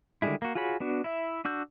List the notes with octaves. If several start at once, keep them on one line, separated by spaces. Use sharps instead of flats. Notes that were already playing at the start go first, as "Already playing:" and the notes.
D3 D#3 G3 G#3 E4
A#3 F#4
F4 F#4 G#4 C#5 B5
B3 D4 F#4
E4 E5
D4 F#4 E6 G6